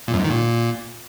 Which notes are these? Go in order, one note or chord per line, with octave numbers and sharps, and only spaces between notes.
A#2
F#2
G#2
D#3
A#2